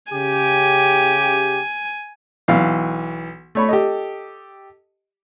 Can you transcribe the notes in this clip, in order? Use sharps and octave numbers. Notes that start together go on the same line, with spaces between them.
C#3 G4 G#5
B1 E3 F5
A3 C#5 B5
G4 A4 D#5